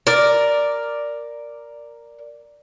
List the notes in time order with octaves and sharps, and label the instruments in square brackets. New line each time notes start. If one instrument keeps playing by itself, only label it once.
[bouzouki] A#4 D5